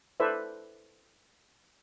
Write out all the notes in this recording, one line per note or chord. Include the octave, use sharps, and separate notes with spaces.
E4 A4 B4 C5 D5 E5